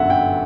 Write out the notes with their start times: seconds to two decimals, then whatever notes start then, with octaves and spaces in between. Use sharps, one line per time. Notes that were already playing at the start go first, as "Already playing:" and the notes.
Already playing: G1 F#2 D3 E5 F#5
0.10 G5